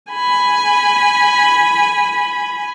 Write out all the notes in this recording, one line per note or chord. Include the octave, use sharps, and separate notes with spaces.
G#5 B5